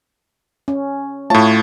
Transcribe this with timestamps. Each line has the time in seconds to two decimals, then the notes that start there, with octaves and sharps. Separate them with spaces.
0.68 C#4
1.30 A2 A3 F4 C#5 A5